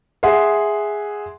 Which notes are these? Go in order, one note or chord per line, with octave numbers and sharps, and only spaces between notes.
G#4 E5 F#5 C6